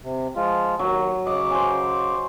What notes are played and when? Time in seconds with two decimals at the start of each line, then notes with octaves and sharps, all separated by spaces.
0.03 C3
0.36 F3 G#3 F4
0.79 D#2 F#3
1.27 C#3 D#5 D6
1.51 C5 G#5